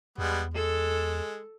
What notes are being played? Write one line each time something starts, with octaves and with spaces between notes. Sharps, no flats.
E2 G3 G#3 B3
G#3 A4